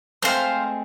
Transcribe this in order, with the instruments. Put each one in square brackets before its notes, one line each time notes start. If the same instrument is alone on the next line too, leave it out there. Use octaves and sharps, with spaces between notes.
[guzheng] G#3 A3 C4 [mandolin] C5 F5